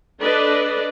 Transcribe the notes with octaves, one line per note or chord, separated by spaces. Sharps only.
D4 A4 B4 D5 D#5